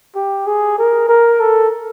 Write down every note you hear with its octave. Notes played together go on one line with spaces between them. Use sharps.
G4
G#4
A#4
A#4
A4